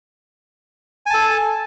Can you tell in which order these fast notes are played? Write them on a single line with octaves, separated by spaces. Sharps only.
G#5 A5 A4